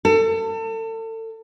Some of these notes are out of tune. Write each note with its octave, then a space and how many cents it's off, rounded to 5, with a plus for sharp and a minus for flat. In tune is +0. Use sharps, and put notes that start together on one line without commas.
A4 +35